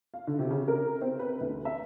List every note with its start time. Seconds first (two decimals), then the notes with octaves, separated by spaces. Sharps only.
0.14 F5
0.27 D3
0.39 C3
0.50 C#3
0.68 A#4
1.02 C4
1.19 B4
1.41 D2
1.65 E5